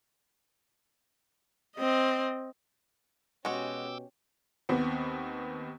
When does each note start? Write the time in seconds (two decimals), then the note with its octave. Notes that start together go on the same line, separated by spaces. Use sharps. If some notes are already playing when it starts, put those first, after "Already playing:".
1.76 C4 D#5
3.45 B2 G#3 C#4 F#4 G4 G5 D6 E6
4.69 D#2 B3 C4